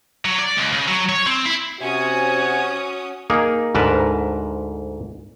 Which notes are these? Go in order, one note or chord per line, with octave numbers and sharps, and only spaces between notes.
F#3
D5
C#2
C#3
F#3
C#5
C4
E4
C3 C#4 F#4 G#5 D#6
A#3 D#4 G#4 A#4
D2 G#2 A#4 B4 A5